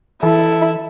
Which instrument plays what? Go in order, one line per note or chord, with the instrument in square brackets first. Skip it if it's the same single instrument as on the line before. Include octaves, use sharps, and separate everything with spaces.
[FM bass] E3 [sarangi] E4 [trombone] A4